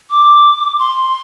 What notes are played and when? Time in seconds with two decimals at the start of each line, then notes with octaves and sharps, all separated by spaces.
0.10 D6
0.79 C6